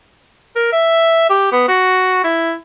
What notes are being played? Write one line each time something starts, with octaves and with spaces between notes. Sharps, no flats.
A#4
E5
G4
B3
F#4
E4